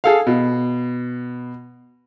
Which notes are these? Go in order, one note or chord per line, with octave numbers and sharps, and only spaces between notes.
G#4 A4 F5
B2